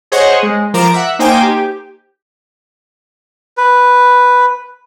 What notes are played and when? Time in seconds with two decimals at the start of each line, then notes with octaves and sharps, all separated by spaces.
0.12 G#4 C5 C#5 D#5 F#5
0.43 G#3
0.74 F3 A#4 A#5 D6 D7 E7
0.94 E5 F#5
1.19 A#3 D#4 C5 G5 G#5 D6
1.43 G4
3.57 B4